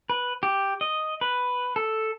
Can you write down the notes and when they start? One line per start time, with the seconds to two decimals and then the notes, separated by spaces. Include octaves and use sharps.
0.10 B4
0.43 G4
0.81 D#5
1.21 B4
1.76 A4